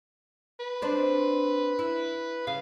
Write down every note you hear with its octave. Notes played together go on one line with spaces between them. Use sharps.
B4
C4 D4
E4
C#3 F5